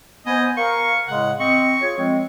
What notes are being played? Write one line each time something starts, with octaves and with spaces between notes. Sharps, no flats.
B3 C5 D#5 G#5
A#4 F5 C#6
A2 C#3 G#3 F#5
C4 D#5 C#6
F4 G#4 C#5
F3 G#3 C4